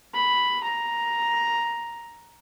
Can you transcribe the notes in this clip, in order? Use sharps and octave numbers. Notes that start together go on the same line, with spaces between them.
B5
A#5